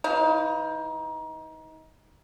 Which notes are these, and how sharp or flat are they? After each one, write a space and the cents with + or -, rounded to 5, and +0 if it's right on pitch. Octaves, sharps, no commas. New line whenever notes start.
E3 +0 D#4 +25 F5 +0